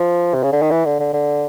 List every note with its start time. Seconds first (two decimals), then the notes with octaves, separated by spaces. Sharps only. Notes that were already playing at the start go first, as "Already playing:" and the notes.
Already playing: F3
0.34 C3
0.43 C#3
0.52 D3
0.62 D#3
0.71 E3
0.85 D3
1.00 D3
1.13 D3